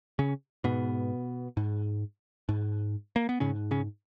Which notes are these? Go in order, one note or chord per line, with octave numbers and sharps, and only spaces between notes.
C#3 C#4
G#2 B2 B3
G#2
G#2
A#3
B3
G#2 C#3 C#4
C#3 C#4